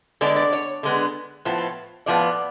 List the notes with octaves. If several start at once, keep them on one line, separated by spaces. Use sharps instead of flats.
D3 G#3 B3 D5
D5
C#5
D3 G#3 B3
A2 F3 B3
A2 F3 B3 D5